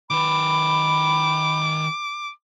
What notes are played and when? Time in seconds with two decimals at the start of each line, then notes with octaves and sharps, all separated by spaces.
0.11 D#3 B4 B5 D6